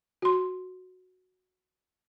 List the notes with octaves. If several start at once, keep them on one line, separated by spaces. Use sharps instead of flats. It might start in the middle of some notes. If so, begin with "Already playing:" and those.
F#4 C6